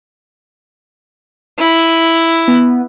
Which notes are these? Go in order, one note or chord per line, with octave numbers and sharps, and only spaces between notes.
E4
B3